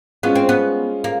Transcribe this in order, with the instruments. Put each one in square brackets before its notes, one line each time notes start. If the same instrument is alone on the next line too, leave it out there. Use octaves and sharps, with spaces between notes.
[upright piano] G#3 C#4 F4 [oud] B3
[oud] C4
B3
A#3